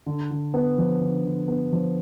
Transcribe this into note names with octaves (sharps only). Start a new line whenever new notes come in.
D3
D3
B3
F3
D3
D3
B3
F3